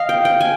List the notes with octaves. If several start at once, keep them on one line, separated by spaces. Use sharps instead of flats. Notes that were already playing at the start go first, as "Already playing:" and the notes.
Already playing: D#5 F5
G5
G5
G#5